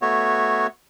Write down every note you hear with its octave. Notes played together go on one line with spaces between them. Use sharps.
A3 B3 F#4 C#5